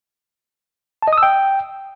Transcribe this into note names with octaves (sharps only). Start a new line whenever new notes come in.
A5
D#5
D#6
E6
G5